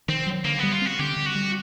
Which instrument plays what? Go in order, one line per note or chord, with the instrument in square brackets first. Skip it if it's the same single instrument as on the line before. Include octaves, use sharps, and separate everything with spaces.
[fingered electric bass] D#3 [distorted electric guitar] C4
[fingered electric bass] F#3
[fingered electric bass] D3 [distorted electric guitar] A#3
[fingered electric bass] G3 [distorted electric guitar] B3
[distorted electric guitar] F4
[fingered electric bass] C4 [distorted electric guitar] F#4
[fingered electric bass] D3 [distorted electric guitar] G4
[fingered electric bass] D3
[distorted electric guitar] F#4
[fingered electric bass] G3